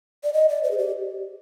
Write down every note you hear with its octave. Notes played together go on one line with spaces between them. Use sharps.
D5
D#5
D5
C5
G#4
G4